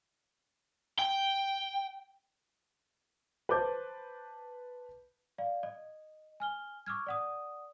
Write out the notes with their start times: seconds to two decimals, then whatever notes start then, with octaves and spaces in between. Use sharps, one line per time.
0.99 G5
3.49 B4 C5 A5 D6 G6
5.38 D5 F5
5.63 D#5
6.40 G#5 F6 G7
6.86 C#6 D6 E6 F6 G#6
7.07 D5 F#5 D#6